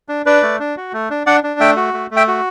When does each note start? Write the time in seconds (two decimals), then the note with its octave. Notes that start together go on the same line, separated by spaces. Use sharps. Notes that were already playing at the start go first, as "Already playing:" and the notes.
0.09 D4
0.26 D4 B4 D5
0.43 A3
0.60 D4
0.77 F#4
0.93 A3
1.10 D4
1.26 D4 D5 F#5
1.44 D4
1.60 A3 E5 G5
1.76 F#4
1.94 A3
2.11 A3
2.16 E5 G5
2.28 F#4